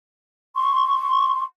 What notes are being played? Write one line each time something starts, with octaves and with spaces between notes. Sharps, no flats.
C6 C#6